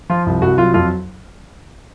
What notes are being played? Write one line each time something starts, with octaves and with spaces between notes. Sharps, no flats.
F3 F4
C2
C2 F#4
F#3 F4
F2 F4